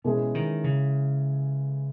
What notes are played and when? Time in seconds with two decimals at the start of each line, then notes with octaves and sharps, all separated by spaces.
0.04 B2 E3 G#3 C#4 G#4
0.35 D#3
0.64 C#3